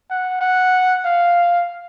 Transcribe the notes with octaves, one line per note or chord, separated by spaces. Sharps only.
F#5
F#5
F5